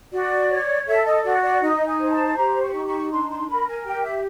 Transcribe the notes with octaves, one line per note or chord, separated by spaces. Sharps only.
F#4 D5
C#5
A4 E5
D#5
F#4 D5
D5
D#4 D#5
G#5
C5
A5
G4 A#5
C#6
D#4
C#6
D4 C6
C6
A#4 B5
G#5
G4 G5
E5